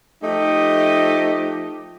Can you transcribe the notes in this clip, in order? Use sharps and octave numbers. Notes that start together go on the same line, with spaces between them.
F3 A3 D#4 G4 D#5